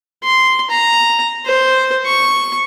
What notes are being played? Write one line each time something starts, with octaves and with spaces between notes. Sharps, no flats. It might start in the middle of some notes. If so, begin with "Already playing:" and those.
C6
A#5
C5
C#6